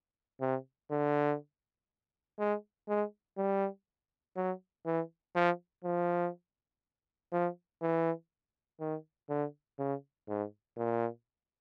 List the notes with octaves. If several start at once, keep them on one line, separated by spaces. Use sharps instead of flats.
C3
D3
G#3
G#3
G3
F#3
E3
F3
F3
F3
E3
D#3
D3
C#3
G#2
A#2